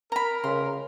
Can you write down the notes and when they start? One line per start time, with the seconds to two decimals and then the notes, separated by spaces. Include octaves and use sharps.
0.12 A#4 A#5 B5
0.44 C#3 C6